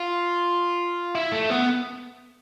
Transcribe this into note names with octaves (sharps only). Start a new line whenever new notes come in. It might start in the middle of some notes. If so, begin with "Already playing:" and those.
Already playing: F4
E4
A3
B3